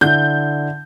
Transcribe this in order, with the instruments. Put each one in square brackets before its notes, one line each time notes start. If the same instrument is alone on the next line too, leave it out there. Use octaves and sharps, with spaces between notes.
[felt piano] D3 E4 [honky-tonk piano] G6